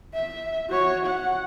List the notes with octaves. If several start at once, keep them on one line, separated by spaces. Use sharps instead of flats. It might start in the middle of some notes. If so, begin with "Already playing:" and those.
E5
F#4 C#5
F#5